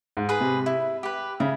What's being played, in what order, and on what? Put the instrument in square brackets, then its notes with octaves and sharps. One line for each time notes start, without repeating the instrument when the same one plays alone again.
[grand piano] G#2
[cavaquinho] G#4 B4
[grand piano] C3
[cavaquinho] E4
G4 B4
[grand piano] C#3 [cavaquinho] E4